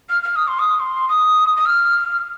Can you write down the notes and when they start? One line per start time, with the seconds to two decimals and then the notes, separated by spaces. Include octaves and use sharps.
0.09 F6
0.23 F6
0.36 D#6
0.48 C6
0.59 D#6
0.80 C6
1.09 D#6
1.56 D#6
1.66 F6